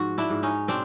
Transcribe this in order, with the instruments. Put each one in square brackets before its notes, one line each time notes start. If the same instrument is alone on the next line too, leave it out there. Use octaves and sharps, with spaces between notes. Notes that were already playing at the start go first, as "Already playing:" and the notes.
Already playing: [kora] G#2 F3 F#4
D4 E4
G#2
C#4 D#4
B2 C4 D4